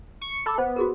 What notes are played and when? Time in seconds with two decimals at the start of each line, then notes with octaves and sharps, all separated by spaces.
0.21 C#6
0.46 A4 B5 D6
0.58 B3 C5
0.76 F#4 G#4 A#4